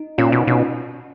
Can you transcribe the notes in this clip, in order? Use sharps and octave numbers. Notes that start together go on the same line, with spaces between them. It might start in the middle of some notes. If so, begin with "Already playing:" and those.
Already playing: D#4
A#2 C#4 F4
B2
B2 C#4